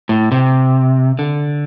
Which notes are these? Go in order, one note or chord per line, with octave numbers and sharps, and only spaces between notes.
A2
C3
D3